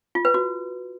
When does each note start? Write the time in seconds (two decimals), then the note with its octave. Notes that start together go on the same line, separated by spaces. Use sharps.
0.15 F4
0.25 B4
0.34 F#4